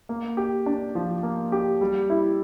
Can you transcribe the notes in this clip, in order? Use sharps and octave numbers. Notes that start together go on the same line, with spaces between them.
A#3
G4
D4
F3
A#3
G4
G3
E4